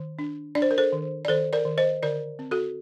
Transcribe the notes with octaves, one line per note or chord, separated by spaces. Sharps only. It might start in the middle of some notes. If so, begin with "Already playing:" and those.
Already playing: D#3
D4
D4 D5
C5
A#4
A4 C5
D#3
D5
D#3 A4 C5
A#4 D5
D#3
C5 D#5
D3 A#4 D5
C4
F#4 A4